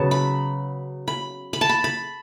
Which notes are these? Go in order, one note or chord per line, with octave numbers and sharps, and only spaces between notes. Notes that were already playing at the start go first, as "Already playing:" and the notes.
Already playing: C#3 F#3 B3 A5
B5
B5
B5
A5
B5
B5